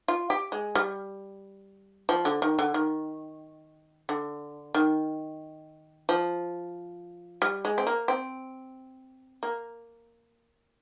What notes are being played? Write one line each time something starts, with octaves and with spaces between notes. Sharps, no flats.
F4
G4
G#3
G3
F3
D3
D#3
D3
D#3
D3
D#3
F3
G3
G#3
C4
A#3
C4
A#3